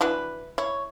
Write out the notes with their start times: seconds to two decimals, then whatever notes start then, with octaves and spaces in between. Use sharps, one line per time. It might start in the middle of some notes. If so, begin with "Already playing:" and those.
0.01 E3 D4 E4 F#4 B4
0.58 E4 C#5